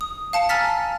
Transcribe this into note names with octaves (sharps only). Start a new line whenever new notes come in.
D#6
F5 A5 C#7
G#5 A#5 E6 F6 A6 B6